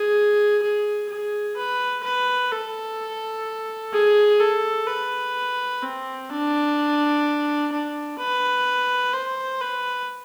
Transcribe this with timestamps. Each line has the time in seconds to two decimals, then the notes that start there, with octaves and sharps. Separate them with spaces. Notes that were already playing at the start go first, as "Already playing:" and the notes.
Already playing: G#4
0.62 G#4
1.09 G#4
1.57 B4
2.03 B4
2.51 A4
3.93 G#4
4.40 A4
4.87 B4
5.82 C4
6.30 D4
7.72 D4
8.19 B4
9.14 C5
9.61 B4